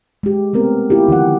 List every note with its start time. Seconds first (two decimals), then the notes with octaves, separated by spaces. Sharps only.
0.23 G#3 G4
0.53 A3 B3 C4 A#4
0.90 E4 F4 G4
1.08 D3 D#3 F3 F#5